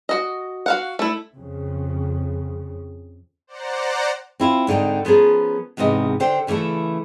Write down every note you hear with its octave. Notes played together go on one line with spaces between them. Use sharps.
F#4 D#5
F#4 F5 F#5
A3 E4
F2 C#3
C5 D5 F#5 A#5
C4 E4 F4
G#2 D3 C4 D#4 G5
F3 B3 C#4 G#4 A#4
E2 G#2 C3 B3 D#5
D3 C5 G5
C#3 E3 A3 E4 A4